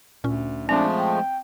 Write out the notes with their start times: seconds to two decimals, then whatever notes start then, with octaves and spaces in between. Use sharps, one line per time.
0.24 D2 A#2 C#4
0.69 F3 G#3 A3 C4 D4
0.99 G5